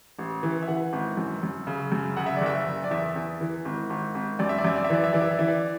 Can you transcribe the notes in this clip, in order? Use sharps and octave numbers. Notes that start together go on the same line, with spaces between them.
A1
E3
E5
E3 F#5
G#1
F#2
F#2
C#3
F#2
C#3 F#5
E5
D5
F#1 E5
F#1
D5
E2 E5
E2
E3
G#1
G#1
G#1
F#2 D5
E5
D5
F#2 E5
D5
E5
E3 D5
E5
E3 D5
E5
D5
E3 E5
D5